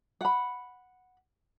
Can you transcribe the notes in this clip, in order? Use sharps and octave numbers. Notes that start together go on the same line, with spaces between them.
F#5 B5